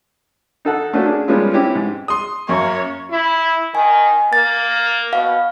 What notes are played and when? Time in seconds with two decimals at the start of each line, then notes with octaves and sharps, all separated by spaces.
0.65 D#4 A4 F#5
0.93 A3 A#3 C#4 D4 F#4
1.06 D4 G#4
1.28 G3 G#3 A#3 B3 C#4 F4
1.53 C4 C#4 E4 G4
1.75 G#2
2.08 C6 D#6
2.49 F#2 A#3 C#5
3.11 E4
3.75 D#3 G#5
4.33 A#3 A6
5.13 B2 F5